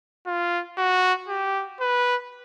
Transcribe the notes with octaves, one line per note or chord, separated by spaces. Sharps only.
F4
F#4
G4
B4